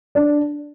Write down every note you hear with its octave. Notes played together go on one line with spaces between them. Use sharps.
D4